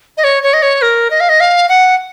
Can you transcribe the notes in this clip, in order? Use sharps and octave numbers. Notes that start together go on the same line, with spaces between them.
D#5
C#5
C#5
D#5
C#5
A#4
D#5
F5
D#5
F5
F#5